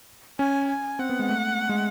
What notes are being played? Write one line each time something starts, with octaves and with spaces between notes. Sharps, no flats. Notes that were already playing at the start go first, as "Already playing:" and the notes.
C#4 G#5
G#5
C4 F#5
B3
G#3
A3
G#3